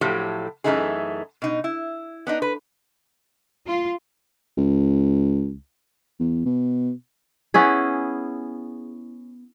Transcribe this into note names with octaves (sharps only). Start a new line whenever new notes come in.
A2 F3 F#3 A3 G4
F#2 C#3 E3 A3 D#4 G#4
B2 D#4
E4
B3 D4 D#4
B4
F4
C#2
E2
B2
B3 C#4 E4 G#4